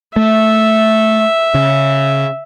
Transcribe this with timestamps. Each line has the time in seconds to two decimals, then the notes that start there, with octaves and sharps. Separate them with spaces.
0.16 A3 E5
1.54 C#3